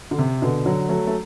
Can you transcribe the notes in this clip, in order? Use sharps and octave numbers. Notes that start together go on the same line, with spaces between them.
D3
C3
B2 D3
D3 F#3
F#3 A3
A3